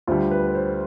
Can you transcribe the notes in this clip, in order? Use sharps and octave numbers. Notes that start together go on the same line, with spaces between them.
D2 D3 G3 F4
B4
C5